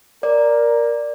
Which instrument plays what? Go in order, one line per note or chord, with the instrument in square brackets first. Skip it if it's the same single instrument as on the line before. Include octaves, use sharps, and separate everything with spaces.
[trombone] A#4 [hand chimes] D5